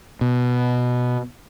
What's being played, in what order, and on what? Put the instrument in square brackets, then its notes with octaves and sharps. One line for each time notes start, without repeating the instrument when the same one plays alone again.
[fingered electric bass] B2